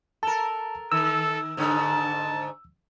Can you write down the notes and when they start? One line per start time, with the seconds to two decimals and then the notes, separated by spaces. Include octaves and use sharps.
0.23 A4 A#4 A5
0.92 D#3 A4 E6
1.57 G#2 D3 C#5 A5